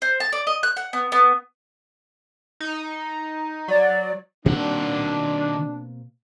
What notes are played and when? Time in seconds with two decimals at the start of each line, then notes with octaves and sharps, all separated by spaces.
0.02 C5
0.20 A5
0.33 D5
0.47 D#5
0.63 F#6
0.77 F#5
0.93 B3
1.12 B3
2.60 D#4
3.68 F#3 D5
4.46 B2 D#3 A#3 C4 D4 F#5